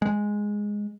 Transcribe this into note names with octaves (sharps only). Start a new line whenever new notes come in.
G#3